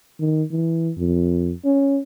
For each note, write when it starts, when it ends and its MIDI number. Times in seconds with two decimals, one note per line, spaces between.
0.20 0.43 51
0.51 0.91 52
0.97 1.53 41
1.65 2.00 61